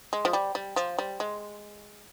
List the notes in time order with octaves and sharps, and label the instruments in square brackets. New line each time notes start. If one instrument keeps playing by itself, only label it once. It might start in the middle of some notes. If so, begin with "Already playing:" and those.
[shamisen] G#3
F3
G3
G3
F3
G3
G#3